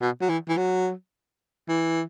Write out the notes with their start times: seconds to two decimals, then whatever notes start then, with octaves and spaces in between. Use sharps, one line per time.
0.01 B2
0.21 F#3
0.29 E3
0.48 E3
0.57 F#3
1.68 E3